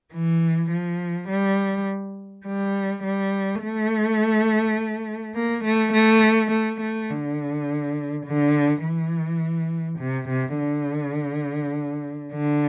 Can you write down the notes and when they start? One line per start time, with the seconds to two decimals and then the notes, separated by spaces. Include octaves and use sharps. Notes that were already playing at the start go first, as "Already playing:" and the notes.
0.13 E3
0.71 F3
1.29 G3
2.45 G3
3.03 G3
3.61 A3
5.35 A#3
5.65 A3
5.93 A3
6.51 A3
6.81 A3
7.10 D3
8.26 D3
8.84 E3
9.99 C3
10.29 C3
10.58 D3
12.32 D3